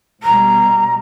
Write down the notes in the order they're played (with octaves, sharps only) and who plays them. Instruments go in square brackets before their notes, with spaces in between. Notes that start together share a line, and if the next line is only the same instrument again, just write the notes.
[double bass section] B2 G3 [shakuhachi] A#5